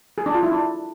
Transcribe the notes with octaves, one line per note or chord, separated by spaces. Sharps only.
G#4
D4
F4
E4
D4